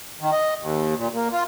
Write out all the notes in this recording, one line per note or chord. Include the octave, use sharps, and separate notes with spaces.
D#3
D#5
D#2
A#2
A#3
F4